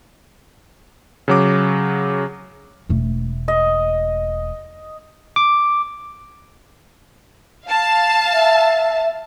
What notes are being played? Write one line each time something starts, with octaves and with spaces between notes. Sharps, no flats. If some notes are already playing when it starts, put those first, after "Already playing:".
C#3 F#3 D6
E1 A3
D#5
D6
F5 A5
E5